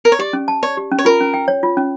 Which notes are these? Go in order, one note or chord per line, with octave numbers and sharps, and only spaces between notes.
A#4
C#5
G4 D5
C#4
A5
C#5 D5
G4
C#4
C#5
F4 A#4
C#4
G5
C#5
F4
C#4